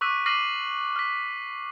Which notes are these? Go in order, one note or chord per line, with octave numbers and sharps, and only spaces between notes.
C#6 D6 E6 F#6 B6 D#7
D6 F6 A#6 C7 D#7 F#7
F6 B6